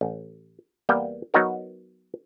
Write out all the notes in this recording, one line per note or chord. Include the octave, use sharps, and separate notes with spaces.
A1
E2 G3 A#3 B3 G5
F#3 B3 D#4 F#4 A#4